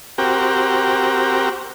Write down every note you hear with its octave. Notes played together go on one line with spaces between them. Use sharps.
C4 F#4 G4 A#4